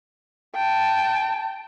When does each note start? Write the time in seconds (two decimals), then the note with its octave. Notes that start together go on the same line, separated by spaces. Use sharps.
0.55 G5 A5